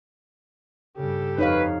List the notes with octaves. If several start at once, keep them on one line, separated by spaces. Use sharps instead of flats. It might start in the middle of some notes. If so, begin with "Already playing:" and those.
G2 C#3 G4 A4
F2 D#4 B4 C#5 F5